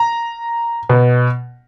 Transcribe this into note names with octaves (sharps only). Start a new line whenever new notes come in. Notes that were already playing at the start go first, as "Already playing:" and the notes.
Already playing: A#5
B2